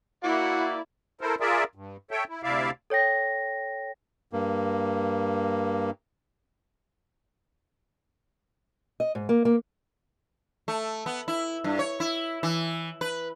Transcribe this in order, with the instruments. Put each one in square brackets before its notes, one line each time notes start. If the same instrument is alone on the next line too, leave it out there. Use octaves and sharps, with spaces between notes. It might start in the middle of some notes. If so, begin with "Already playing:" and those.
[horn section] A#3 D5 [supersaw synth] E4 [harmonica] F#4
[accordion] E4 A4 A#4 C5
F4 G#4 A#4 D5 E5
G2
A4 C#5 E5 G5
E4
D2 C3 E4 D5 E5 F5
[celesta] A4 C#5 G5 A#6
[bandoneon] G2 A#3
[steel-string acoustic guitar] D#5
G#2
A#3
A#3
[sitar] A3
B3
E4
G2
C#5
E4
E3
B4